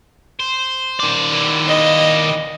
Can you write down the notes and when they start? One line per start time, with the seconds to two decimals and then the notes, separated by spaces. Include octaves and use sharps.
0.39 C5
1.00 D#3 D5
1.32 E3 G3
1.68 D#5